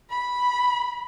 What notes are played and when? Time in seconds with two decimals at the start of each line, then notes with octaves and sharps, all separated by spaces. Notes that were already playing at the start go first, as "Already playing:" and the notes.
0.10 B5